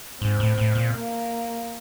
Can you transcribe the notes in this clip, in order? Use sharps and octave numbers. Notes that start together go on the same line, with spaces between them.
G#2 C4
A2
A2
A#2
A#3